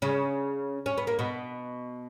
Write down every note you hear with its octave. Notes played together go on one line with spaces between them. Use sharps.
C#3 C#4
C#4
B3
A#3
B2 B3